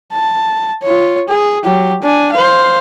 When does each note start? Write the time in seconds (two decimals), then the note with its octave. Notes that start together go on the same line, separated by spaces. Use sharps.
0.13 A5
0.83 F4 C#5
1.28 G#4
1.64 F#3 G4
2.03 D4 G#5
2.33 C5 F5